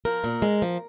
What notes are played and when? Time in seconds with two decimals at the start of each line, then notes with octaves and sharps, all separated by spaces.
0.05 F3 A#4
0.24 A#2
0.42 G#3
0.62 F3